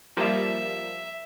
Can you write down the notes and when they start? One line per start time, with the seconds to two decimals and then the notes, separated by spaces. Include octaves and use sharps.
0.17 F3 G3 A#3 E5